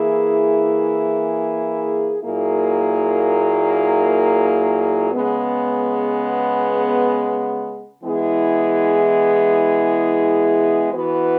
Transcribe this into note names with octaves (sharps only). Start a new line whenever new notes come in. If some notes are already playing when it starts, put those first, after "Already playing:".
Already playing: E3 A#3 E4 G#4
A#2 F#3 A#3 E4 G#4
C#3 G#3 B3
E3 G#3 B3 E4 G#4
E3 B3 F#4 B4